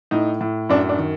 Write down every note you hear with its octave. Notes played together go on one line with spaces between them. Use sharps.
A2 D#4
A2
F#2 D4
D4
D#3